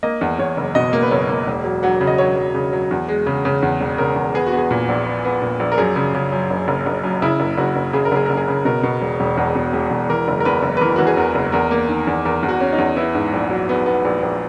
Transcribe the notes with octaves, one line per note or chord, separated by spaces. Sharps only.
A#3 D#5
E2
E2 C#5
F#1
B2 D#5
A#3
B4
F#1 C#5
A#3
E1
F#3
F#3 F#5
C#3
D#5
F#3 C#5
F#3
C#3
F#3
E2
G#3
C#3
C#3
E2
E1
C#3 A#4
E2
B3 G#4
F#4
B3
G#4
A#2
A#1
B3
B3
A#2
A#1
A#4
F#2 G#4
C#3
C#3
F#2
F#1
F#1
F#1
F#2
C#3 E4
F#1
F#1 F#4
F#1
C#3 G#4
A#4
F#1 G#4
F#1 A#4
G#4
C#3
B2 A#4
B2
E1
E1
E2
B2
E1
E1
E3 A#4
F#1
A#4
E2 B4
F#1
B4
E3 A#4
E3 F#4
G#4
E2 A#4
F#1
E2 A#4
A#3
D#3
E2
E2 A#4
E2
F#4
C#4
D#4
E2
B3 E4
G#2
A#1
F#3
B3
B3
A#1
A#1